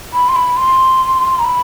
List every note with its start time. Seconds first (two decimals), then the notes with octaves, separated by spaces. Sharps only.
0.14 B5
0.29 C6
0.36 B5
0.57 C6
1.39 A#5
1.45 B5